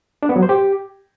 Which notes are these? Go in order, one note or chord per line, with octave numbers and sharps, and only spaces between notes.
D4
B3
F#3
C5
G4